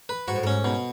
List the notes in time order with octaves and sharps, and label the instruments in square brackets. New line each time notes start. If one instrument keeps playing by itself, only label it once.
[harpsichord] B4
[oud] G#2 [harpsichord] F#4
[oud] A2
[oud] G#2 [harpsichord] C#4
[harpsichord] B2